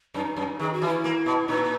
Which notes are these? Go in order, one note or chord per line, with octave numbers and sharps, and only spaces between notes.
F#2 D#4
F#2
D#3 G#4
F#4
E3
E4
A#3
B2
A#2 D#4